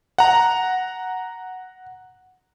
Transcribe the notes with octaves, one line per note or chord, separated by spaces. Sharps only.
F#5 A#5